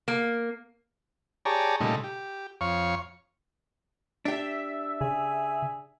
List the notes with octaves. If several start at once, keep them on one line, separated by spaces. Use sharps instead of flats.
A#3
G4 G#4 C#5 D5 A5 A#5
A#2 C#3 G3 A3 D#4
G4
F2 C#5 F5 C#6
D4 G4 E5
C#3 G#4